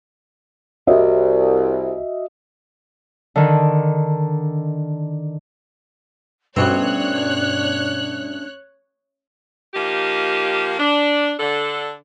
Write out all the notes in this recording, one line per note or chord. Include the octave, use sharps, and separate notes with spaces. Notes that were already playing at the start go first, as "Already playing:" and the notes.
C2 F#4 D#5 E5
D3 D#3
A1 G2 B2 C4 D4 C#5 F#6
F3 A#3 D#4 G4
D4
D3 A4